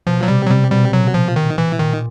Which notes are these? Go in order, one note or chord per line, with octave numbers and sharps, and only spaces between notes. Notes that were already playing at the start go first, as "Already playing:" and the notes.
B2 F3
F#3
C3 G3
F#3
C3 G3
B2 G3
A#2 F#3
F3
D#3
E3
A#2 D#3